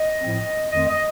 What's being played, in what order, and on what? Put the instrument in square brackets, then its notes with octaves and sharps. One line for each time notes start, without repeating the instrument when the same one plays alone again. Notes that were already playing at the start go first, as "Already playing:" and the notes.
Already playing: [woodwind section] D#5
A2 F3 C4
F2 D#3 A3 C4 D#5
D#5